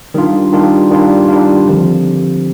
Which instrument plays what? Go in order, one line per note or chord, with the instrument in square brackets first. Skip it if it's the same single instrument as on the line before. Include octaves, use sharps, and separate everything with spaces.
[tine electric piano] D#3 G3 D4 F4
D#3 G3 D4 F4
D#3 G3 D4 F4
D#3 G3 D4 F4
D3 F3 C4 G4